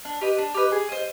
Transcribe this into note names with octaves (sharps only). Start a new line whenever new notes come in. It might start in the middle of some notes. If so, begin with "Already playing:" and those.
D4
G4 B4 D#5
D4
G4 B4 D#5
G#4
C5 D#5